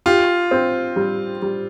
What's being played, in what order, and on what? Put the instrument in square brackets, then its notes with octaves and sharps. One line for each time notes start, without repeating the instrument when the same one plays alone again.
[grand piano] F4 [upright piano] G4
[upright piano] C4
G3
G3